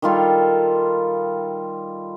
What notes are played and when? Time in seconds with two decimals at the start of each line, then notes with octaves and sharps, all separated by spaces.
0.02 D#3 G3 F4 A4